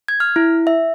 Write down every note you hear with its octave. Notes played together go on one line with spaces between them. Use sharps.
G#6
F6
E4
E5